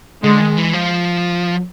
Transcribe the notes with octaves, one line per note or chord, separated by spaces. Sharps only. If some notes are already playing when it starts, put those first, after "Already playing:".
D3 G#3
D#3
E3
F3